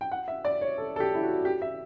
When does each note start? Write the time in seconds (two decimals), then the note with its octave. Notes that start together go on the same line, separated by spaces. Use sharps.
0.01 G5
0.12 F#5
0.28 E5
0.45 D5
0.61 C#5
0.78 A4
0.96 A4
1.00 G4
1.14 E4
1.23 F#4
1.45 G4
1.62 E5